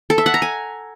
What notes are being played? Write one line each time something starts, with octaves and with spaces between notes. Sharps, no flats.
A4
E5
F#5
A#5
G#5